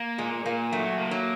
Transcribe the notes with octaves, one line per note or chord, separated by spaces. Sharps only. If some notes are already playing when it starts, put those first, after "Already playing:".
Already playing: A#3
A#2 G#3
A#2 A#3
F#3 A3
A#3
F#3